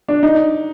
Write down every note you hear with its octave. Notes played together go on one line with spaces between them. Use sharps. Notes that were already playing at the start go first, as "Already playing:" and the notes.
D4
D#4